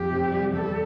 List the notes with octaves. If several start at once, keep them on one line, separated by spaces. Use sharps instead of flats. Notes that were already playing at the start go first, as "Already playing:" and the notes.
Already playing: F2 G4
C3
G3
E2 A4